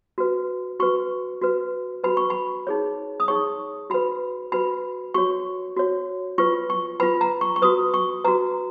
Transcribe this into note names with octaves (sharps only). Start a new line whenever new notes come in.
F#4 B4
F#4 B4 C#6
F#4 B4
F#4 B4 B5
C#6
B5
D#4 G#4 C#5
D#6
D#4 G#4 C#5 C#6
F#4 B4 B5
F#4 B4 B5
F#4 C#5 C#6
F#4 C#5
F4 B4 C#6
C#6
F4 B4 B5
A#5
C#6
C#6
F#4 B4 D#6
C#6
F#4 B4 A#5